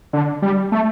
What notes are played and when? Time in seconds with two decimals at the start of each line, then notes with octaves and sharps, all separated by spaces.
0.13 D3
0.42 G3
0.72 A3